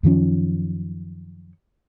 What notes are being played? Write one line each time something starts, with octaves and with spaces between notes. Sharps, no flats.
F#2 D#3 F3 C#4